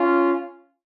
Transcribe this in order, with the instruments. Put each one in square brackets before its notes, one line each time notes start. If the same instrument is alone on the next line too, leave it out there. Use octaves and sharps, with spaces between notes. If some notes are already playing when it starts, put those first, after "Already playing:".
Already playing: [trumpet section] C#4 F4